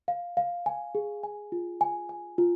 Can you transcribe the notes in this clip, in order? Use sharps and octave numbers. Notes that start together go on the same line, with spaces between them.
F5
F5
G#5
G#4
G#5
F4
G#5
G#5
F4